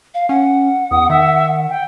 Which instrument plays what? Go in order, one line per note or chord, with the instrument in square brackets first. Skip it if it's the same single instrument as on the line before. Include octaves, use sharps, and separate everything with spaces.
[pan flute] F5
[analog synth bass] C#4 [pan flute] F#5
[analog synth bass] E2 [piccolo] D#6
[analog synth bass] D#3 [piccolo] E5
[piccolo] G5